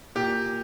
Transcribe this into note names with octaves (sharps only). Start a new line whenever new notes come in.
A#2 G4